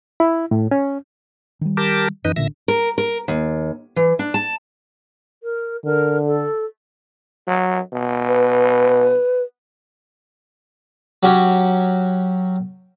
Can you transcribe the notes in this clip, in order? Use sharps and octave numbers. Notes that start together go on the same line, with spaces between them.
E4
A2
C#4
D#3 G3
G4 A#4 A5
F#2 E3 D#4 B4 D#5
A1 A#2 D3 E5 A#6
A#4
A#4
D#2
E3
D4
A5
A#4
D3 A#4
A4
F#3
B2
B4
F#3 C#4 F#4 G4